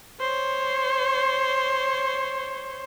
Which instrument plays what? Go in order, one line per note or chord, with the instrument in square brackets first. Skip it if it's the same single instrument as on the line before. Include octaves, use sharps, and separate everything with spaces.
[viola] C5 C#5